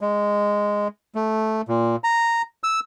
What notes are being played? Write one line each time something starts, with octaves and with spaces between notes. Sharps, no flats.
G#3
A3
A#2
A#5
E6